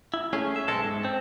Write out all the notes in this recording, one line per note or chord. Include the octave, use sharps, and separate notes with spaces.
E4
A3 C#4 G#4
E5
B1 G#3 C4 A4 A5
G#2
C4